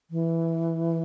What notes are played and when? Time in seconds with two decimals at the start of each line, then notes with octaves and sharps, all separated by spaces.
0.11 E3